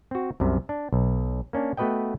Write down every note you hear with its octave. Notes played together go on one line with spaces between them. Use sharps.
C4 F#4
C2 F#2 C3
D4
B1
A#3 C#4 D4
A3 B3 F#4 B4 D#5 G5